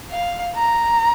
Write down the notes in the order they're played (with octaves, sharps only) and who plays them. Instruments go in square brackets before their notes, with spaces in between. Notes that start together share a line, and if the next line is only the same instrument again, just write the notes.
[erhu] F5
A#5